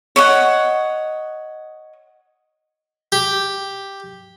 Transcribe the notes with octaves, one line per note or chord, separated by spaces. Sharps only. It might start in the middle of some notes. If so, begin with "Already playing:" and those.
C#5 D#5 F#5
G4